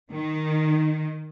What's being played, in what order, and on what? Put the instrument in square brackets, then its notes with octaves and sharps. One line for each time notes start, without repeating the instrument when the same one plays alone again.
[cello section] D#3